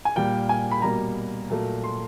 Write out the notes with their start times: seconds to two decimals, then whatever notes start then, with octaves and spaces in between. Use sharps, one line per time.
0.05 G#5
0.16 A#2 G3 A#3 G5
0.49 G#5
0.71 B5
0.82 B2 G3 A#3 A#5
1.50 A#2 F#3 A3
1.84 C6